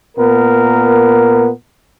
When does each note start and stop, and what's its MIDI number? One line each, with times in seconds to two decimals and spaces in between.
0.18 1.50 46
0.18 1.50 59
0.18 1.50 70